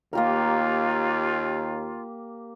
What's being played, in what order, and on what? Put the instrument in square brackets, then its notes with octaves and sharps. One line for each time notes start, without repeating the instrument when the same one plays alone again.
[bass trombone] D#2 [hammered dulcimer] A#3 G4 A#4 [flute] F4